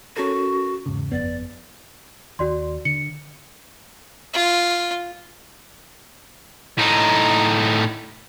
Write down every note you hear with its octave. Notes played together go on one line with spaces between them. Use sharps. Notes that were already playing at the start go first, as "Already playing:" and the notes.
C#4 F#4 A4 A#4
E2 G#2 C#3
G1 F2 B3 D5
D#2 F#4 D5 C6
D3 C#7
F4
A2 D#4